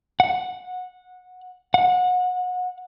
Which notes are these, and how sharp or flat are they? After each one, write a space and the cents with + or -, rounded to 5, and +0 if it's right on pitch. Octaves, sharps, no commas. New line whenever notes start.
F#5 -15
F#5 -30